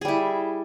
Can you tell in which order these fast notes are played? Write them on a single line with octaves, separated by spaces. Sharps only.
G#4 G3 E4